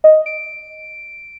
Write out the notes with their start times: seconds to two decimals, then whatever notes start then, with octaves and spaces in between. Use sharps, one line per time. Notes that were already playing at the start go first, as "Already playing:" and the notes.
0.04 D#5
0.26 D7